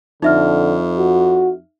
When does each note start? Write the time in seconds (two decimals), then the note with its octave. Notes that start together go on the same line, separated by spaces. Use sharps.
0.22 F2 D3 D#4 E5 F6
0.99 F#4